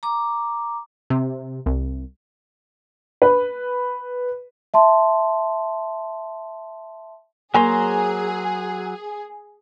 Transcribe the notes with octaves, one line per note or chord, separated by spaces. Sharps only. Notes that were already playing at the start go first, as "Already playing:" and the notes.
A#5 D6
C3
C2
B4
E5 A5 C6
F#3 A#3 G#4 C5 C#5 G#5 A#5 C6